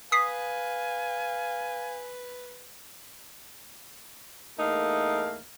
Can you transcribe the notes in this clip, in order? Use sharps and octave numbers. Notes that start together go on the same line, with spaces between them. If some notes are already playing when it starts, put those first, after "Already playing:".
B4 F5 G#5 D#6 B6 C7
E2 A3 A#3 D#4 A#4 F5